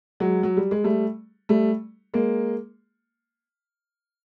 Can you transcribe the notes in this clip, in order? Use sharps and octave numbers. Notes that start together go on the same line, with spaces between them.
F#3 G#3
F#3
G3
G#3
G3 A3
G3 A3
G#3 A#3